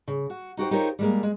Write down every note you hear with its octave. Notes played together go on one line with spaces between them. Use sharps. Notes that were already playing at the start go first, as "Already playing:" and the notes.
C#3
F#4
D#4 F#4 G4 C5
D#4 F4 G4 A#4 C5 C#5
G3 G#3 A#3
G#3